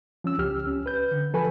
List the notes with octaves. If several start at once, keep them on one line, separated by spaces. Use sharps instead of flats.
F3 C#4 E6
C#2 G4 F6
C#4
B4 G6
D3
F3 A4 B4 G#5 B5